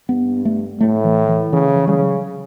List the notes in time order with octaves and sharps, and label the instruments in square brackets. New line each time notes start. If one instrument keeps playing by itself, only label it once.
[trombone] G2 [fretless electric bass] B3
[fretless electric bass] A3
[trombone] A2 [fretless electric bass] A3
[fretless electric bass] E3
E3
[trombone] C#3 [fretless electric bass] E3
[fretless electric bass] E3
[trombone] C#3 [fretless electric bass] G3
[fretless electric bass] F#3